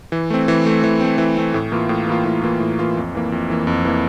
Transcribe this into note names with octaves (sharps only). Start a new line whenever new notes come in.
E3
A3 C4
E3
A3 C4
E3
A3 C4
E3
A3 C4
A2
E3 A#3 F4
A2
E3 A#3 F4
A2
E3 A#3 F4
A2
E3 A#3 F4
F2
E3 A#3
F2
E3 A#3
F2
E3 A#3